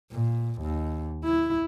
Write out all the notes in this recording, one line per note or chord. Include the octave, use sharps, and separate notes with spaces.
A#2
D#2
E4